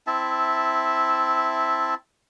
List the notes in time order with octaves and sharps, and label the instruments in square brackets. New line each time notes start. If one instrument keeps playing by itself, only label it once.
[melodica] C4 E4 E5 A5